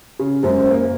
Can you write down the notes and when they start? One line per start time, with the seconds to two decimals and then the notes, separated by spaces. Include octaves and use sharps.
0.19 C#3
0.43 F#2 G#3 C5
0.70 A#3